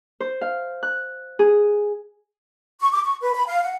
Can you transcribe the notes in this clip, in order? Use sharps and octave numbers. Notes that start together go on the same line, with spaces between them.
C5
F5
F#6
G#4
C#6
D6
C#6
B4
B5
F5
F#5